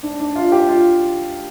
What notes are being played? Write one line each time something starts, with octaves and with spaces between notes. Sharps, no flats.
D4
D4
F4
G4
F4